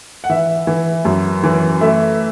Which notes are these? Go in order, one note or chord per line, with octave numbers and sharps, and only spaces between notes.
F#5
E3 E5
E3
F#2
E3
A3 E5